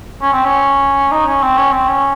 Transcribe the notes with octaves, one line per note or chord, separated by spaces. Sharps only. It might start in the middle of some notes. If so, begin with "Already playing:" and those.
C#4
C4
C#4
D#4
C#4
C4
C#4
C4
C#4